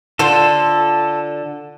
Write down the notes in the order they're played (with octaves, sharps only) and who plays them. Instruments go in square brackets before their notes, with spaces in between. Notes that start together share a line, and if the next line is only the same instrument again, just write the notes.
[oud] D3 F4 C5 [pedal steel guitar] A4